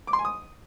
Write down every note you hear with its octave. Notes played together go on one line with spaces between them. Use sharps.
D6
C6
G#5
D#6